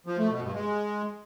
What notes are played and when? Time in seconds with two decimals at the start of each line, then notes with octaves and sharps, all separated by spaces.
0.06 F3
0.18 A3
0.30 B2
0.42 G2
0.54 G#3